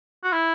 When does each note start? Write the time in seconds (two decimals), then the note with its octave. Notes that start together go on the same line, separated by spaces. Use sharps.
0.24 F#4
0.33 E4